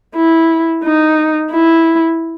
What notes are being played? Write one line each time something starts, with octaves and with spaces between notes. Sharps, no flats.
E4
D#4
E4